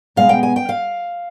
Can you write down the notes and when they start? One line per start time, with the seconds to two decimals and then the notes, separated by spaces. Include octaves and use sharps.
0.16 B2 G#3 B3 F5
0.29 G5
0.43 G#5
0.56 G5
0.69 F5